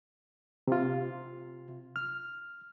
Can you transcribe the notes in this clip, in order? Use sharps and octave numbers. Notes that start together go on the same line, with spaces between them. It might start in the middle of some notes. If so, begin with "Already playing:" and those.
C3 F4
F6